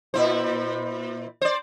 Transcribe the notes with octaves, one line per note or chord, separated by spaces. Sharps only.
A#2 E4 C5
C5 D5